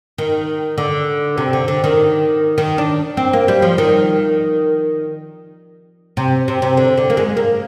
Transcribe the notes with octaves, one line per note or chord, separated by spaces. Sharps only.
D#3
D3
C3
D3
D3
D#3
D#3
D4
C4
A#3
G3
F3
D#3
C3
C3
C3
D3
D3
A#3
G#3
A#3